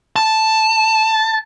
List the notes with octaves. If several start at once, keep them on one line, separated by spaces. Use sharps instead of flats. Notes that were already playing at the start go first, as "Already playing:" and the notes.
A5